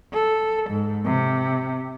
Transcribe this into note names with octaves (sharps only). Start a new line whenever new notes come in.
A4
G#2
C3